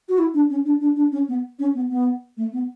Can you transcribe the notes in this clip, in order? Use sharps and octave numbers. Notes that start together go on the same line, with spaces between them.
F#4
E4
D4
C#4
D4
D4
D4
C#4
B3
C#4
B3
B3
A3
B3